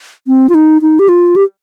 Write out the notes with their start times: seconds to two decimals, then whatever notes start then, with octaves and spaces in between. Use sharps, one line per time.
0.27 C4
0.49 F4
0.54 D#4
0.82 D#4
0.99 G4
1.09 F4
1.36 G4